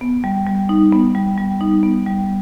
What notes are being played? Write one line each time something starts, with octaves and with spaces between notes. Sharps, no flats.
B3
G3
G3
D#4
B3
G3
G3
D#4
B3
G3